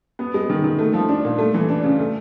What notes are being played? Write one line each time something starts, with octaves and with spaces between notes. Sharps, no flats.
B3
G#3
D#3
D#3
A3
F3
D4
A#2
A3
E3
D4
C#3
A3